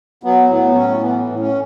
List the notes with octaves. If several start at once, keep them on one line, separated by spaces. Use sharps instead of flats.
F#3 B3
A2 B3
A2 C#4
E3 B3
A2
C#4